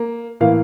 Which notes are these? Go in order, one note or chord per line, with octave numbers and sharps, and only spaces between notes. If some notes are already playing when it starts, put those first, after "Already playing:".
Already playing: A#3
A2 E3 A#3 F5